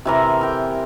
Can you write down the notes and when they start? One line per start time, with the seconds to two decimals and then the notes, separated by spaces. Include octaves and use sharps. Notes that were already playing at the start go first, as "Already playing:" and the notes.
0.05 C3 E3 A#4
0.41 A#4 G5